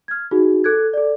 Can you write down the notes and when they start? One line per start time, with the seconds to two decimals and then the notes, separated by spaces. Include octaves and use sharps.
0.08 F6 G#6
0.31 D#4 F#4 G#4
0.64 A4 F#6 G#6
0.93 A4 D5